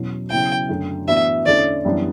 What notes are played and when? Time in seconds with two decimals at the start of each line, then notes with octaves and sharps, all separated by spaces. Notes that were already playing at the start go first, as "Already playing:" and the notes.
Already playing: E2 B2 F#3 C#4
0.30 C#3 F#3 B3 E4 G5
0.69 F#2 D3 A3
1.08 A2 E3 B3 D4 F#4 E5
1.46 E2 D3 A3 C#4 D5
1.85 F#2 E3 G3 B3 D4